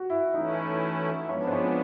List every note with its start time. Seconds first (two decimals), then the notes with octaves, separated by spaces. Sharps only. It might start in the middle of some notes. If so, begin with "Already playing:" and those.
Already playing: F#4
0.10 E4
0.34 E3 A3 C#4 D#4 E4
1.28 F3 G#3 B3 C#4 D4
1.47 C4
1.53 C#4